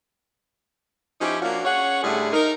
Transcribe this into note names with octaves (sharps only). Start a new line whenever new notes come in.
F3 C#4 D#4 E4 G4
F3 A#3 C#4 D4 F4 F#4
C#4 G#4 C#5 F#5
A2 D3 G3 A3 G#4
D#4 A#4